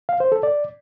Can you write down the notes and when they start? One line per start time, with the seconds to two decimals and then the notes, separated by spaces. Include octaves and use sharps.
0.09 F5
0.20 C5
0.32 A4
0.43 D5